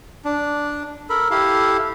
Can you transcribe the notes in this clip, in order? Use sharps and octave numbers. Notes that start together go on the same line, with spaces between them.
D4
A4 A#4 B5
E4 G4 A4 F5